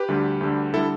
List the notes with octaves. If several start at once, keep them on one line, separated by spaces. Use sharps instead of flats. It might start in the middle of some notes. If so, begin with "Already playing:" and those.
Already playing: G4 B4
D2 D3 G3
D2 D3 G3
D3 G3 E4 A4